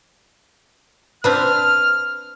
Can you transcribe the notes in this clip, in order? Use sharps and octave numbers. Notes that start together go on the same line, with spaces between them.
C4 D4 B4 F6